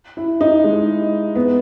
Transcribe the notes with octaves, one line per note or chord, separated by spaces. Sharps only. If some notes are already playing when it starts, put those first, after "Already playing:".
E4
D#4
G#3
B3